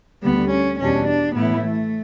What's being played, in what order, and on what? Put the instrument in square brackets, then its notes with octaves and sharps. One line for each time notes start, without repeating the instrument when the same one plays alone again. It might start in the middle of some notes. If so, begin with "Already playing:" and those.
[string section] D2 D3 G3 [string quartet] B3
[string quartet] C#4
[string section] E2 B2 G3 D4 [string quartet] C#4
[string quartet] D4
[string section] A2 E3 A3 E4 [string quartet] B3
[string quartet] A3